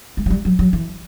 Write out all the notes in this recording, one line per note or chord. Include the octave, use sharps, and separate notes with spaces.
G#3
F#3
G3
F#3
F#3
E3